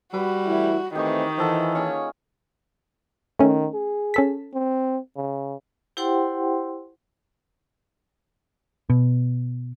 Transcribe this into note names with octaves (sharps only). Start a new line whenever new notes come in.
G3 F#4 B4
E3 A3 E4
D#3 E3 A3 C4 G4 D#5 C#6
E3 F4 A4 C5 F#5
A#3 C#4 G#4 C#5
D#3 A3 C#4
G#4
C#4 A4 B6
C4
C#3
E4 G4 C5 F#5 G5 C6
B2